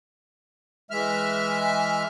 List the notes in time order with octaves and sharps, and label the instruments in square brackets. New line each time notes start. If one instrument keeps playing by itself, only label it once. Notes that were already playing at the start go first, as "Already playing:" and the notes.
[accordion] E3 G#3 E5 F6